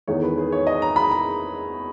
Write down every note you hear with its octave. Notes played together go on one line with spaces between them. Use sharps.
E2 D#3 G#3 C#5
B4
G#4
C#5
D#5
A#5
B5
A#5